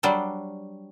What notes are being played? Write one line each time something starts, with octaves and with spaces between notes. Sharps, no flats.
F#3 G3 D4 C5